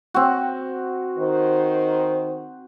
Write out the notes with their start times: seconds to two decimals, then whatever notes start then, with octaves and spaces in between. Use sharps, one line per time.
0.14 C4 F#4
1.18 D#3 C5